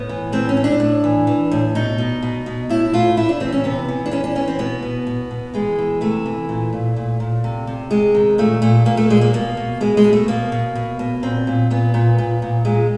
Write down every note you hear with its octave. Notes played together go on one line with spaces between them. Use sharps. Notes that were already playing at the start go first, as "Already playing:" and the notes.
Already playing: A2 B3
E3
A2 C4
C#4
A2
D4
A2
E3
E3
A2
B2 D#4
B2
B2
B2
A2 E4
A2 F4
A2 E4
D4
E3 C4
C#4
C3 B3
E3
D4
E3 C#4
D4
E3 C#4
C4
B2 B3
B2
B2
B2
E3 G#3
E3
C3 A3
E3
A#2
A#2
A#2
A#2
C3
C3
C3 G#3
D#3
A#2 A3
A#2 A3
A#2 A#3
A3
A#2 G#3
A#3
B2 A#3
B2
B2 G#3
G#3
B2
A3
B2 A#3
B2
B2
B2
A#2 C4
A#2
A#2 B3
A#2
A#2
A#2
A#2 G#3